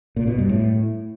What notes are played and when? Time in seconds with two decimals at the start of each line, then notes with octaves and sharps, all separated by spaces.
0.16 A#2
0.27 B2
0.38 G2
0.49 A2